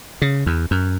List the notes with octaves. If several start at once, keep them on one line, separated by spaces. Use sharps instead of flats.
C#3
E2
F#2